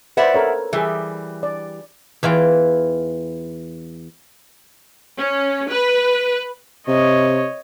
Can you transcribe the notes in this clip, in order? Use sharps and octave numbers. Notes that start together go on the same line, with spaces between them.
B4 C5 D5 E5 F#5
A4 A#4 C#5
E3 G3 G#4 E5
D5
E2 E3 F4 G5
C#4
B4
C3 C#5 D#5